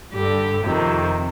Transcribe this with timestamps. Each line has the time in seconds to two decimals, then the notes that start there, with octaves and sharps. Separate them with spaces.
0.12 G2 D3 G4
0.64 F2 C3 D#3